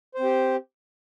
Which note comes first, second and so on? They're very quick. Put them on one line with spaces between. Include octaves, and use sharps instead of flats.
C5 C4 G4